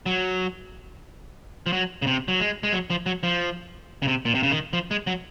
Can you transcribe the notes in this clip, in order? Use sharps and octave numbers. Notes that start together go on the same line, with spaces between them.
F#3
F3
F#3
C#3
C3
F#3
G#3
G#3
F#3
F3
F#3
F3
C#3
C3
A#2
C3
C#3
D#3
F3
G#3
F#3